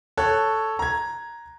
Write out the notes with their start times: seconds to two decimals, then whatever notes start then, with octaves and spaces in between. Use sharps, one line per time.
0.17 A4 C#5 F#6
0.79 A#5 G#6